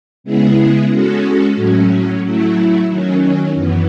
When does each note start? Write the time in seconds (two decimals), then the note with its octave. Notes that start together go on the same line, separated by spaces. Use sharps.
0.24 C#3 G#3 B3 E4 G#4
0.90 G#3 C#4 F#4 A4
1.56 A2 F#3 C#4
2.22 F#3 A3 E4
2.88 D#3 F#3 C#4
3.54 F#2 E3 B3